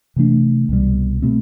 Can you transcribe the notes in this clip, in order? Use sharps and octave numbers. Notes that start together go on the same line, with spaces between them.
C3 E3 A3 D4
C2 B2 G3
B2 A3 C4